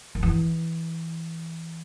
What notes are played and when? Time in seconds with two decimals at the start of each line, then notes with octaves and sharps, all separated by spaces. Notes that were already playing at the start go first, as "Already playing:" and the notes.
0.15 D#3
0.23 E3